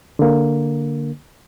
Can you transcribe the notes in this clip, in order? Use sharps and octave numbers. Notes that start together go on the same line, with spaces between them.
D3 A#3